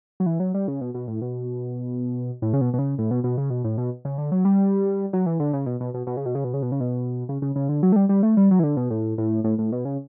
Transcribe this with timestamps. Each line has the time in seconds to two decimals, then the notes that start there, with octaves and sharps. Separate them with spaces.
0.20 F#3
0.26 E3
0.40 F#3
0.54 G3
0.68 C#3
0.81 B2
0.94 B2
1.07 A2
1.22 B2
2.42 A2
2.53 C#3
2.61 B2
2.74 B2
2.79 C#3
2.98 A2
3.11 B2
3.24 B2
3.38 C#3
3.50 B2
3.64 A2
3.78 B2
4.05 C#3
4.18 D3
4.32 F#3
4.45 G3
5.13 F#3
5.26 E3
5.40 D3
5.53 C#3
5.66 B2
5.80 B2
5.94 B2
6.07 B2
6.17 C#3
6.26 B2
6.35 C#3
6.44 B2
6.54 C#3
6.62 B2
6.72 C#3
6.80 B2
7.29 C#3
7.42 C#3
7.56 C#3
7.69 D3
7.83 F#3
7.92 A3
7.96 G3
8.09 G3
8.23 A3
8.37 G3
8.51 F#3
8.59 E3
8.63 D3
8.77 B2
8.90 A2
9.18 A2
9.44 A2
9.58 A2
9.72 B2
9.85 C#3